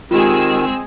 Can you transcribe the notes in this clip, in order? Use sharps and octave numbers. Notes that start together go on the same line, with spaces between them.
D#3 G#3 C4 F4 G4 G#4 E6